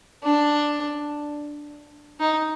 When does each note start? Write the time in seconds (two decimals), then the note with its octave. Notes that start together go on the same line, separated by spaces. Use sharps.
0.23 D4
2.20 D#4